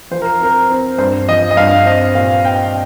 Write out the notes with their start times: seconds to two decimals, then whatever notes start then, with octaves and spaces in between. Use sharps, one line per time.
0.11 F3 C5
0.22 A#4
0.40 C4 A#4
0.70 C4
0.98 G2 C5
1.28 F3 D#5
1.51 D#5
1.57 G2 F5
1.86 C4 D#5
2.15 A#2 F5
2.44 C4 G5